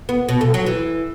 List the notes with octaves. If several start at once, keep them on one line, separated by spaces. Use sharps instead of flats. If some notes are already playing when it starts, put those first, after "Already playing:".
B3
B2
A3
F#3
E3